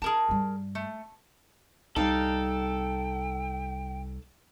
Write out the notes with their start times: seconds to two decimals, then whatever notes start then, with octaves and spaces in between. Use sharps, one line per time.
0.02 D#4 G#4 A#4 A5
0.29 G2 G3
0.75 A3
1.96 C2 G3 D#4 A4 D5 F5 G5